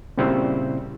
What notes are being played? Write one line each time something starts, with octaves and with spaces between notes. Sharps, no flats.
A#2 C#3 G3 C4 E4 C5